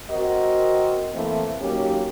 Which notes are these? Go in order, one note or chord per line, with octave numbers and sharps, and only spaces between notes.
C4 F#4 A#4 D#5
E3 A3 A#3 C4 E4
F#3 A#3 C#4 D#4 G4